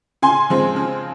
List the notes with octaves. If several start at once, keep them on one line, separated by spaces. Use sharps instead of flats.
C#3 G#5 C6
F3 G#3 C4
C#3